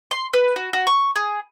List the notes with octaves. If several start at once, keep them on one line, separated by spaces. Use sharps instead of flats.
C6
B4
F#4
F#4
C#6
G#4